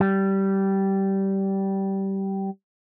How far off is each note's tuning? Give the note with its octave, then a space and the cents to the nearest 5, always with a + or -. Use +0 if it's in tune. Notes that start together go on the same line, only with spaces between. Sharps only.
G3 -15